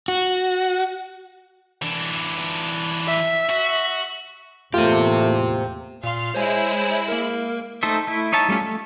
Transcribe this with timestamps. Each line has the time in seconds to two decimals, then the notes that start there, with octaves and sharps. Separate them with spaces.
0.08 F#4
1.82 E3 D4
3.07 E5
3.49 F#4
4.74 E2 A2 A3 A#3 F4 G4 C5
6.04 A#2 F5 C6
6.34 G#3 E4 C5 C#5 G#5
7.08 A#3 A#4
7.83 A3 D#4 A4 C5 E5
8.07 A3 E4
8.32 D#4 C#5 E5 A5
8.49 G3 A3 C#4 F4
8.61 A3